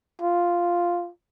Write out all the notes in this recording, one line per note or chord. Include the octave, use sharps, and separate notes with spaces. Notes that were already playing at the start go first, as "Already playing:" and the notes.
F4